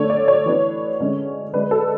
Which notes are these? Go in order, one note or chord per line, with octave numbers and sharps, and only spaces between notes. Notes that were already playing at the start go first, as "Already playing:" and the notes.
Already playing: D3 A3 D4 C#5
D5
C#5
E3 B3 D4
D3 G#3 C#4
D3 G#3 D4 B4
A4